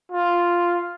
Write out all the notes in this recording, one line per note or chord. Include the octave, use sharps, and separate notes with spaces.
F4